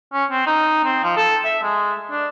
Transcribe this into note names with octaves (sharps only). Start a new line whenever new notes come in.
C#4
C4
D#4
C4
F3
A4
E5
G#3
D4